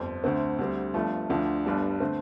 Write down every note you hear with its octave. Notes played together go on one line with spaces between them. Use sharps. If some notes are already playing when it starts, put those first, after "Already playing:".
Already playing: G1 F2 C4
D2 D3 A3 C4
D2 D3 G3 C4
G1 G2 F3 A3
D2 D3 F3 D4
G1 G2 G3 D4
D3 A3 C4